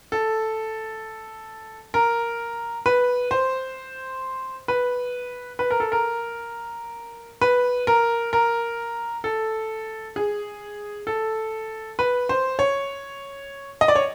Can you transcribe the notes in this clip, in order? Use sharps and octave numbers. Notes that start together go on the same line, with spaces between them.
A4
A#4
B4
C5
B4
B4
A#4
A4
A#4
B4
A#4
A#4
A4
G#4
A4
B4
C5
C#5
D#5
D5
C#5